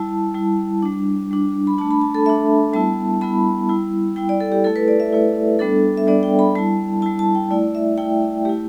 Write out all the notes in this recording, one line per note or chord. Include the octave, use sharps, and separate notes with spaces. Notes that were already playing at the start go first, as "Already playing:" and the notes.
Already playing: G3 E4 A5
G3 E4
G3 D4
G3 D4
B5
A3 D4 A5
B5
A5
A4
A3 D4 E5
G3 B3 E4 A5
G3 B3 E4 B5
G3 E4
G3 E4 G5
D5
A4
G4
A3 E4 A4
B4
D5
E5
A3 E4
G3 B3 D4 A4
E5
G3 B3 D4 D5
G5
B5
G3 E4 A5
G3 E4 A5
A5
G5
A3 E4 D5
E5
A3 E4 G5
A3 E4 G4